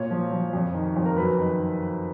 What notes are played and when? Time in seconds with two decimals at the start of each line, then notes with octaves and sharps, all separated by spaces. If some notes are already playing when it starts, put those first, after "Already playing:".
Already playing: A#2 C#5
0.11 F3
0.32 F3
0.53 F2
0.74 D#3
0.96 F2
1.06 A#4
1.17 F#2 B4
1.38 D#3